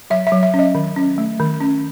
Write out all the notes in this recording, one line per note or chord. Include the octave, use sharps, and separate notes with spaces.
F#3 E5
E5
F#3
E5
C#4
D#5
D#3
C#4
A3
D#3
C#4